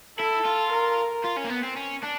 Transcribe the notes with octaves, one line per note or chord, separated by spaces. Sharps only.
E4 A4
F4
A#4
F4
C#4
A#3
B3
C4
C#4
D4